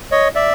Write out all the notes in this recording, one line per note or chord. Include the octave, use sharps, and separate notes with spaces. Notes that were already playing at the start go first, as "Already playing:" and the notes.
C#5 D#5
D5 E5